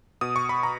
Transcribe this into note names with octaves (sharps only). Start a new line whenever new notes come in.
B2 D#6
C#6
B5
A#5